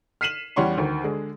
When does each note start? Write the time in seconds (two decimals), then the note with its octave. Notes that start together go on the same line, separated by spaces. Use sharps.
0.21 F6 B6 C7 D#7 E7 F#7
0.56 E2 G3 C#4 F#5 C6 C#6
0.77 D2 D#3
1.04 D3 G#3 G#4